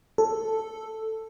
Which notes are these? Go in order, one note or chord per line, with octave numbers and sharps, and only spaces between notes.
A4